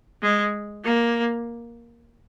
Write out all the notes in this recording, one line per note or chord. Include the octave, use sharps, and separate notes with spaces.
G#3
A#3